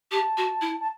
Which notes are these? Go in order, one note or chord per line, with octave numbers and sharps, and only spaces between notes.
G4 A5
F#4
E4
A5